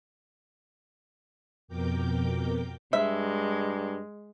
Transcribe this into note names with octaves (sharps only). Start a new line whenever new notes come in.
F2 B2 A#4 G5 D6 G6
G2 G#3 E5